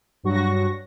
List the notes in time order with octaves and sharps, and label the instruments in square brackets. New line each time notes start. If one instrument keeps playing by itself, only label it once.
[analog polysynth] G2 F#3 F#4 C#6 A#6